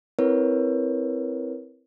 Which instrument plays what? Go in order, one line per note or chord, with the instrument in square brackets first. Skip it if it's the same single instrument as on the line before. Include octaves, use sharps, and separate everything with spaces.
[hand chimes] C4 E4 A#4 B4 C#5